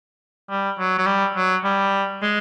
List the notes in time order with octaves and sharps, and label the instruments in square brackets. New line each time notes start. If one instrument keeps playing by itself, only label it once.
[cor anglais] G3
F#3
F#3
G3
F#3
G3
G#3